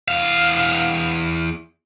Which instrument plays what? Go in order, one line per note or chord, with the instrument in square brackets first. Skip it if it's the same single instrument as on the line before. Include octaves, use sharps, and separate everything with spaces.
[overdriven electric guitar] E2 F5